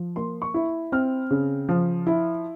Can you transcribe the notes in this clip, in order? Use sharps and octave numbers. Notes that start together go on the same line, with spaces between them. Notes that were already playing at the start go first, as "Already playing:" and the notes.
Already playing: F3
A#3 C6
C#6
E4
C4 F6
C#3
F3
E4